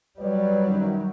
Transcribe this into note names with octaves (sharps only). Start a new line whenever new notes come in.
F#3 G3 B4 C#5 D5
F#2 D#3